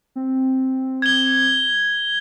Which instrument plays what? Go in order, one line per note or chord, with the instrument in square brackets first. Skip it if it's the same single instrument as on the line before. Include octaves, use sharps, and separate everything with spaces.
[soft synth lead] C4
[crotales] G#6 G7